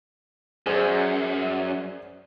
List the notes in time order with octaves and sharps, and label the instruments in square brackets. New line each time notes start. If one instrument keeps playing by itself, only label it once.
[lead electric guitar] F#2 [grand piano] G#4 C5 D5